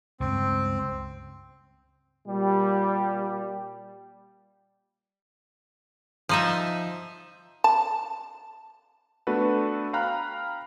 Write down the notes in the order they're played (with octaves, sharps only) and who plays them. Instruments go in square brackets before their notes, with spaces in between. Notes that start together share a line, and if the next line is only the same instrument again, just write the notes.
[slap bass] C#2 G2 [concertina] C4
[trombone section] A#2 G3
[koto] F3 D#4 E5
[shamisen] A5
[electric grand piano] A3 B3 D4 F#4 A4 B4
F5 G5 A#5 B5 F6 F#6